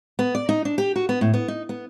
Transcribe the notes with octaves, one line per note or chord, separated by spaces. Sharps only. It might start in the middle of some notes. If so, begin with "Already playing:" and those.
B3
D5
D#4
D4
G4
F#4
B3
A2
B3
D#4
B3